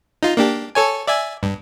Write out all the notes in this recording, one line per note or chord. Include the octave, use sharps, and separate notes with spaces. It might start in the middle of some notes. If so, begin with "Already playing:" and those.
D#4 F4
A#3 D4 G4
A4 C#5 G#5
D5 E5 G#5
G2